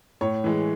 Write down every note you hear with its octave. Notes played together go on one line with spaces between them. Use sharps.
A2 C#5
E3 G#3